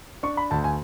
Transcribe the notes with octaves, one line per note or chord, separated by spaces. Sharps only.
D4 C#6
B5
D2 A5
G#5